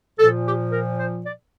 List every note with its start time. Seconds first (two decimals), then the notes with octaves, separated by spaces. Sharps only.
0.19 A#2 F3 A4
0.45 G4
0.72 A#4
0.98 C5
1.25 D5